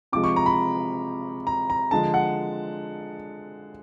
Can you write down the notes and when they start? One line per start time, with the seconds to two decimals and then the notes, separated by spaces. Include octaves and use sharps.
0.12 C3 F3 G#3 D6
0.24 C#6
0.36 A#5
0.46 B5
1.47 A#5
1.70 A#5
1.91 D3 F3 G#3 A5
2.14 F#5